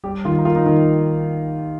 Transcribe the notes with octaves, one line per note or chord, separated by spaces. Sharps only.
G3 G4
D#3 F4
D#4
A#3 F4
D#4
D#3